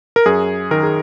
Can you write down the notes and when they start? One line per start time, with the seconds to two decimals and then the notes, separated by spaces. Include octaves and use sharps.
0.16 A#4
0.26 F#2 G#4
0.71 D#3 A#4
0.83 G#4